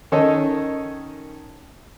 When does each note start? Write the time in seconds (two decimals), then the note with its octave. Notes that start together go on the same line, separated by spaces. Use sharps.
0.12 D#3 C#4 A4 C#5 D#5